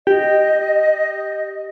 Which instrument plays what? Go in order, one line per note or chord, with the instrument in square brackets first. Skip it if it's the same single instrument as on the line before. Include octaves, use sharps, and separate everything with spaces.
[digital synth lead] G4 [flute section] D#5